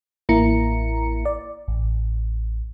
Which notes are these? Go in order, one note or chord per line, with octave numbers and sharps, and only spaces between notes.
A1 A#3 E4 A#5 C#7
D5
A1